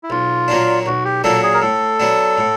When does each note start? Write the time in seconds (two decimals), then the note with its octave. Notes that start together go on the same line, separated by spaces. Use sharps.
0.03 E4
0.10 B1 F4
0.48 A#2 F#3 A#3 D4
0.86 B1 F#4
1.05 G4
1.24 A#2 F#3 A#3 D4 A4
1.43 G#4
1.54 A#4
1.62 A2 A4
2.00 F#3 B3 D4
2.38 A2